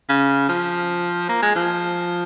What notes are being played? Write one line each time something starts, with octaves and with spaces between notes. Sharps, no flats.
C#3
F3
A#3
G#3
F3